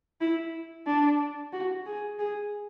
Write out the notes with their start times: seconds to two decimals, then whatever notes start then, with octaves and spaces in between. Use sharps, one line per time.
0.21 E4
0.86 D4
1.53 F#4
1.86 G#4
2.19 G#4